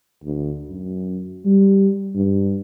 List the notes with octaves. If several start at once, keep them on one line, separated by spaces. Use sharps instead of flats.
D2
F#2
G3
G2